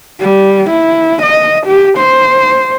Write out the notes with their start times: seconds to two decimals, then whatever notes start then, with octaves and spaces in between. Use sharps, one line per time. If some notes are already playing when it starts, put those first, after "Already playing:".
0.21 G3
0.70 E4
1.23 D#5
1.66 G4
1.99 C5